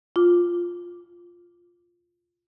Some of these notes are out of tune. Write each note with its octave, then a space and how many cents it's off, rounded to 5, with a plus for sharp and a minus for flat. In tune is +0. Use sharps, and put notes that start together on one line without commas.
F4 +0 D6 +0